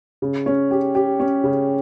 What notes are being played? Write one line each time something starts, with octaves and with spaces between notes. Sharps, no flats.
C#3
C#4
G4
G4
C#4
C#3